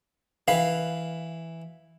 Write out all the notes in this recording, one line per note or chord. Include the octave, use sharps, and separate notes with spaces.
E3 B4 F5